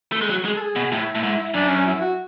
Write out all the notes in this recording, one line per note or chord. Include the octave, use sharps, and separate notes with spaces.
A3
G#3
F#3
G#3
A4
G#4
B2
A2 E4
A2
G#2
F#2 D4
C#4
E4
F#4